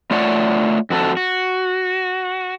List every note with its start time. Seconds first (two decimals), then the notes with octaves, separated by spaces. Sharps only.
0.11 A3 F4 C#5 D5 F#5
0.90 F2 F#4 A4
1.17 F#4